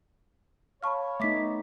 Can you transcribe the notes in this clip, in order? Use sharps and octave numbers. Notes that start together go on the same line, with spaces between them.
C#5 F5 A5 B5 C#6 F6
A3 B3 D#4 D#5 E5 C#6 D6 B6